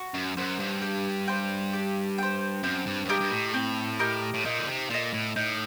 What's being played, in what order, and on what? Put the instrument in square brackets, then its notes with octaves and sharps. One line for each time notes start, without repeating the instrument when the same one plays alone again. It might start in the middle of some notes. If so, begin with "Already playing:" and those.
Already playing: [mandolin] F#4
[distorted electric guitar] F#2
[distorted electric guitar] F#2 [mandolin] C5 F#5
[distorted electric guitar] G2
[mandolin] G4
C5 G5
G4
C5 G5
[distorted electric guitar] F#2 [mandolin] C4
[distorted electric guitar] G2
F#2
[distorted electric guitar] G2 [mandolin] G4 A#4 D#5
[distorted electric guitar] G2
A2
[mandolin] C4
G4 A#4 D#5
[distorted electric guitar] A2
[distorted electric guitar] A#2 [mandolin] D#4
[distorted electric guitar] D3
C3
[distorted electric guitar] A#2 [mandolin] A4 D#5
[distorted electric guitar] A2
[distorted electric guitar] A2 [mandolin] D#4